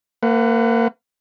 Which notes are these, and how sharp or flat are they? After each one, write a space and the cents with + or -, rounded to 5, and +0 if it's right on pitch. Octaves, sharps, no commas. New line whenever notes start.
A#3 -30 B4 +30 F#5 +5